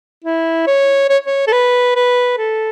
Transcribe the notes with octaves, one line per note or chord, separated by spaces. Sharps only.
E4
C#5
C#5
C#5
A4
B4
B4
A4